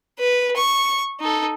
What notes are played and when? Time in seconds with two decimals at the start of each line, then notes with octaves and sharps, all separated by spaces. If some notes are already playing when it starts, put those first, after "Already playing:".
0.19 B4
0.56 C#6
1.20 D#4 A4